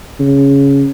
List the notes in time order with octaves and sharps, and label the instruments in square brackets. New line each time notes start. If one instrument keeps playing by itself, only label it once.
[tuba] C#3